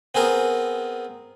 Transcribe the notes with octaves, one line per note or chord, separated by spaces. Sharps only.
B3 C4 G#4 A#4